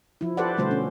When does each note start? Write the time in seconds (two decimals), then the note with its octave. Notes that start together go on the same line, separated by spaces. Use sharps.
0.21 F3 E4
0.37 G4 A4 B4 C5 D5 F#5
0.57 B2 D3 G3 A3 F#4 C5
0.71 C#4